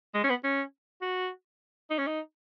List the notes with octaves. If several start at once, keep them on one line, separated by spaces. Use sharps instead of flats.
G#3
C#4
B3
C#4
F#4
D#4
C#4
D#4